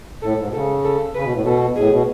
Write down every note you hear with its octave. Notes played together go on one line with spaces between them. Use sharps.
A2 A4
G#2
B2
C#3 A4
A4
C#3 B4
B2
A2
B2 A4
A2 G#4
B2